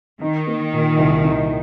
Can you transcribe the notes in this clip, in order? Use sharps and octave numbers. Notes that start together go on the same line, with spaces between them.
D#3 D#4
A#3
A#2
C2
D#4